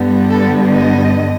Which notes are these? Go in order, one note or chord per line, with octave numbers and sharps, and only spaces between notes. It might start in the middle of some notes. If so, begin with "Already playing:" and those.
Already playing: G2 D3 G3 B3
A4
D#5